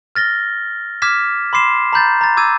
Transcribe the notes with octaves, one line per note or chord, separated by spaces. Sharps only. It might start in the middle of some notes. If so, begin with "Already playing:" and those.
F6 A6 A#6 G7
D6 F6 G#6 B6 E7
B5 C6 D6 C7 E7
A#5 B5 G6 A6
A#5 A6
D6 E6 G#6 D#7